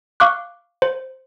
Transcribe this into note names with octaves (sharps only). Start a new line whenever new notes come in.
F5 C#6 D6 F#6
C5